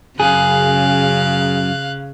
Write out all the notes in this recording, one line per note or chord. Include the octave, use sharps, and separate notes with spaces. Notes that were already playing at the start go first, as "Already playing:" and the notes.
F#2 C#3 G#4 F5 F#6